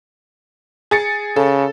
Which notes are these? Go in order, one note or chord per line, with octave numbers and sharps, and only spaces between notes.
G#4 A6 C#7
C#3 A4